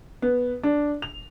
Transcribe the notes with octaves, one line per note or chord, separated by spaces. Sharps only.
B3
D4
F7